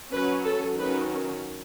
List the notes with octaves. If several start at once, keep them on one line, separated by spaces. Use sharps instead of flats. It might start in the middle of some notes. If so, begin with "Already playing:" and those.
F#3 C#4 B4
A4
D#3 F#3 C#4 B4